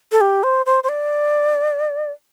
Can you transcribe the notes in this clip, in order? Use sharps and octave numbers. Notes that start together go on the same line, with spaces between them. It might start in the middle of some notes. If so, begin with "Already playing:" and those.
A4
G4
C5
C5
C5
D5